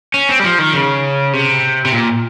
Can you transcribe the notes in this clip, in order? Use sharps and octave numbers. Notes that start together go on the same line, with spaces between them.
C#4
C4
G3
F3
D#3
C#3
C3
C3
A#2